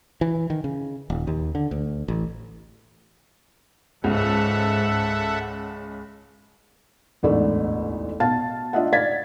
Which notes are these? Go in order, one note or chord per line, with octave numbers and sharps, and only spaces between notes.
E3
D#3
C#3
D#1
D#2
D3
D2
A1
C#2 G#2 A4 E5 F#5
E1 A1 D2 G#2 A3 D5
B2 F5 A5 A6
D4 F4 D#5 E5 F#5
D5 F5 G#6 A6 B6